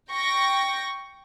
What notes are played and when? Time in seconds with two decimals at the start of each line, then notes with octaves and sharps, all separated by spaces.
0.10 G5 C#6 A#6